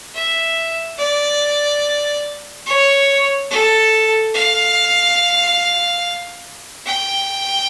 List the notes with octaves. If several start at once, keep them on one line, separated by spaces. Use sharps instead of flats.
E5
D5
C#5
A4
F5
G5